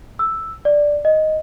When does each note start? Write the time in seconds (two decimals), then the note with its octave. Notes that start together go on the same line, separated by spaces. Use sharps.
0.19 E6
0.65 D5
1.05 D#5